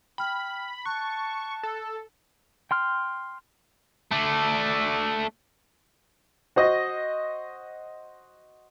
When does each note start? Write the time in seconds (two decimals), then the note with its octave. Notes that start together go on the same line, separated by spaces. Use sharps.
0.18 G5 B5 F6 F#7
0.86 A5 C#6 F#6
1.63 A4
2.71 G5 C6 F6
4.11 A3 D4
6.56 F#4 C5 D#5